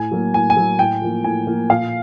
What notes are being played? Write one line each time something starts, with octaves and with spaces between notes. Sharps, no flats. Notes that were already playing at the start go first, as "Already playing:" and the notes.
Already playing: A2 G#5
F#3 A#3
A2 G#5
G#5
F#3 A#3
A2 G5
F3 A#3
A2 G#5
F3 A#3
A#2 F5